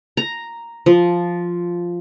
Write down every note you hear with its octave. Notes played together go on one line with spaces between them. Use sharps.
A#5
F3